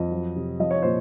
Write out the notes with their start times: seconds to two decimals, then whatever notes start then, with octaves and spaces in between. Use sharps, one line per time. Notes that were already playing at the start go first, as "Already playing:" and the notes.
Already playing: F2 D#5
0.11 F#3
0.36 C3
0.59 F3 D#5
0.71 C#5
0.82 A#2 C5